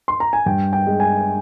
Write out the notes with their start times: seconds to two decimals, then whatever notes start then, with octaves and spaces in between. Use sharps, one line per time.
0.08 C6
0.20 A#5
0.33 G#5
0.46 G2 G5
0.73 G5
0.87 G#3
1.00 G#5